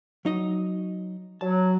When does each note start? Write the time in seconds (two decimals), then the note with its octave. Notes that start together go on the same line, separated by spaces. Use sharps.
0.25 F#3 D#4 D#5
1.41 F#3 A5